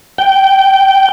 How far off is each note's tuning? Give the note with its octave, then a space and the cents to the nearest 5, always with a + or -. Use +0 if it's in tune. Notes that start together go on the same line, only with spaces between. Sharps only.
G5 -5